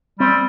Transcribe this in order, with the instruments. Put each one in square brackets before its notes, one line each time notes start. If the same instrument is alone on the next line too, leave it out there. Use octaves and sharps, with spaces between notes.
[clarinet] G3 [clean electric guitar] C4